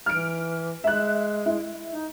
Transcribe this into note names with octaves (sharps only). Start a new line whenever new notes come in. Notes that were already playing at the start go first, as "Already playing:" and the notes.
E3 F6 D7
G#3 E5 F#6
E4
D#4